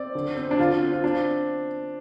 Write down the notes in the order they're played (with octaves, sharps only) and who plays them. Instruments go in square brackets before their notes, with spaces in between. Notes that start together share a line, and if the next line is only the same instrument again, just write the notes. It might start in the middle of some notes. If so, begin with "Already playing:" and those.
Already playing: [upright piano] C4 D5
D3
C4
D4
D3 F4
C4
F4
C4 D4